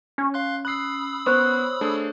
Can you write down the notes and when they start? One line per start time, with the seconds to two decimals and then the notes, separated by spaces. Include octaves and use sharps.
0.18 C#4
0.34 F5 C6 F#6
0.65 B5 D#6 E6 F#6 C7
1.26 B3 C5 C#5 F#6
1.81 A3 D4 G#4